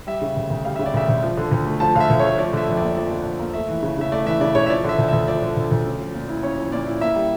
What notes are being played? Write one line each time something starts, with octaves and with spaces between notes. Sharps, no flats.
G3 E5
C#3
D2
D2
G3 F5
C#3 E5
D5
D2 E5
D2
F3
D3
D2
A3
F3 A5
D3 E5 F5
D2
A3 C#5
F3 D5
D3 E5
F2
A#3 D5
F3 D5
D3
F2
A#3
A3 E5
E3
C#3
C#3 E5
A3 D5
E3 E5
C#3 D5
C#3 C#5
E5
F3 D5
D3 E5
D2
D2 E5
F3 D5
D3
D2
D2
C#4
F3
A#2
E4
C#4 C#5
F3
A#2 D5
E4
A#3 E5
G3